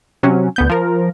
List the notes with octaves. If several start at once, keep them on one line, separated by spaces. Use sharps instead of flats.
C3 F#3 C#4
D2 B3 G6
F3 A#4